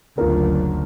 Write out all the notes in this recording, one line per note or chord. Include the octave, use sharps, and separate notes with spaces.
F#1 D2 F4 A#4